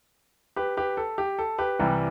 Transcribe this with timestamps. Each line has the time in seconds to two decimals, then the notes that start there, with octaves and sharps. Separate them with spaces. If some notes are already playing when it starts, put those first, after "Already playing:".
0.56 G4 B4
0.77 G4 B4
0.97 A4
1.18 G4
1.39 A4
1.58 G4 B4
1.79 C2 C3 E3 G3